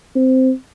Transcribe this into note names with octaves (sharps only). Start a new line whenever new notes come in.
C4